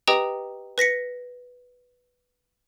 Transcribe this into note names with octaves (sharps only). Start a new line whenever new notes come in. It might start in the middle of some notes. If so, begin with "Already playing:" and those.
G4 B4 D#5 G5 A#5 D#6
B4 A#6 B6 C#7